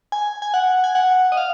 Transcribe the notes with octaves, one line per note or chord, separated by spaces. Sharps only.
G#5
G#5
F#5
G#5
F#5
D#5
F5